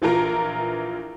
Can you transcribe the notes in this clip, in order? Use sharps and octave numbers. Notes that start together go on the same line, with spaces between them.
A#1 E3 F4 A#4 A#5